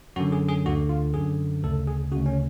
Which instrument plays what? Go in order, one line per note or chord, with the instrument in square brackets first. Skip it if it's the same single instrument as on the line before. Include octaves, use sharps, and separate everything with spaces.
[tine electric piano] F#2 D3 F#4
G#4
G#4
D2 D3 F#4
F4
F#2 D3 G#4
D2 C#3 A4
G#4
D2 C#3 F#4
C#4